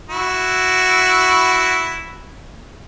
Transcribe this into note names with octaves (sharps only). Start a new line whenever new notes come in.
E4 F#4